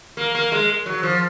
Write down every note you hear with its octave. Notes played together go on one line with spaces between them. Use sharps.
A#3
A#3
G#3
F#3
F3